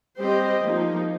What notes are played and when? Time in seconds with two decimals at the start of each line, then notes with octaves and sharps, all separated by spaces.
0.19 G3 C4 G4 C5 D#5
0.62 F3 A#3 D#4